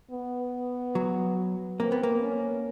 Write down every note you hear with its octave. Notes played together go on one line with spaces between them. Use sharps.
B3
F#3
A#3 C4
B3
A#3
C#4